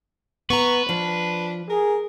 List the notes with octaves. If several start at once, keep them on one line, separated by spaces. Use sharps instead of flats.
B3 B4 A#5 C#6
F3 D4 F4
G#4 A#4